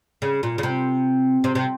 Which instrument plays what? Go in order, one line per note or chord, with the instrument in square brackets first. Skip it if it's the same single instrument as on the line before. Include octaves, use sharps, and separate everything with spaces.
[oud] C#3
A#2
C#3
C3
C3
C3